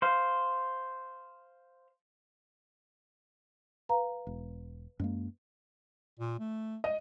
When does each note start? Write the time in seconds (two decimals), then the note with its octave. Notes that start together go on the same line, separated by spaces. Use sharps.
0.02 C5 F5
3.89 B4 F5 A#5
4.27 E1
5.00 F#2 G#3 A#3
6.19 A#2
6.39 A3
6.84 D#5